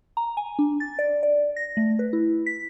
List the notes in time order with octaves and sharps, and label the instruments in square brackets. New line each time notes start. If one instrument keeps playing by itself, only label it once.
[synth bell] A#5
G#5
D4
A6
D5
D5
A#6
A3
B4
E4
B6